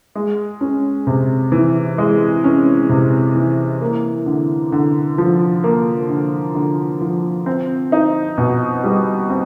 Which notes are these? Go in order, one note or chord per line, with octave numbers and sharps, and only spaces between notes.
G#3
C#4
C3
E3
G#3
C#4
C3
E3
A#3
D3
D3
F3
A#3
D3
D3
F3
C4
D#4
B2
G3
C4